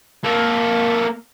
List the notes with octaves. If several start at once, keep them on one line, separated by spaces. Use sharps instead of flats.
A#3 A4